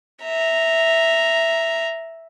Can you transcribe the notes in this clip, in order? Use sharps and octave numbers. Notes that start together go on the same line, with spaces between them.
E5 A#5